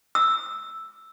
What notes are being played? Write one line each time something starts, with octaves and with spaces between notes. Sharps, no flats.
E6